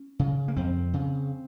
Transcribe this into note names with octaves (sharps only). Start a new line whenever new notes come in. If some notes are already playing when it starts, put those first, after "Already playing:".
Already playing: C#4
C#3
A#3
F2 C4
C#3